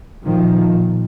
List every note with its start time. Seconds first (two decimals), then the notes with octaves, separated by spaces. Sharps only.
0.24 A#2 D#3 F3
0.74 A#2